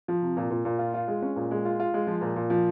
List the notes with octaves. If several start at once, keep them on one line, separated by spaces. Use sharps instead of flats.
F3
C3
A#2
A#2
A#2
F4
F4
G#3
C#4
A#2
G#3
F4
F4
G#3
F3
A#2
A#2
F3